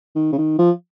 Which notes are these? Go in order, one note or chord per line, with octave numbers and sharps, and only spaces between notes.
D#3
C#3
D#3
F3